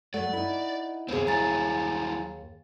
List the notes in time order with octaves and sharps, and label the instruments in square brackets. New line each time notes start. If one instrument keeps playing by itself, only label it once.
[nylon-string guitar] F#3 A3 [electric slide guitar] D5 [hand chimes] F#5
[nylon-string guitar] D#4 E4
[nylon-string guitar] D#2 G#4 [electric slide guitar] C3 B3 C4
[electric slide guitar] F#3 G3 E4 [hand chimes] G#5 A#5 A6